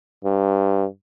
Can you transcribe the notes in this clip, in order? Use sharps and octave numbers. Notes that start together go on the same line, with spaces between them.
G2